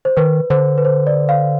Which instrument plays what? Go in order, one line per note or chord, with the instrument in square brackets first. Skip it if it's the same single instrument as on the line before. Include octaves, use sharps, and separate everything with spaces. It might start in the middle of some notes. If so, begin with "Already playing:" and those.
[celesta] C5
[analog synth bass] D#3 [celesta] B4
[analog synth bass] D3 [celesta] C5
[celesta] B4
C5
D5
F5